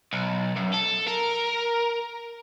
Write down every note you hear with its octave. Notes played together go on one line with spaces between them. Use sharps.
B1
F#2
A4
A#4